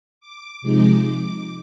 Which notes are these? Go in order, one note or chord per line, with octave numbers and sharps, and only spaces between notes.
D6
C3 F3 G#3 D#4 D6